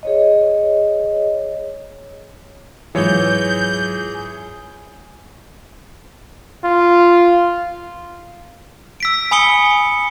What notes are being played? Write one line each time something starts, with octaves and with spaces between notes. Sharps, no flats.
G#4 C#5 D#5
G#2 E3 F#3 F4 G#4 C#5 G6
F4
E6 B6 D7
G#5 B5 D#6 C#7 G7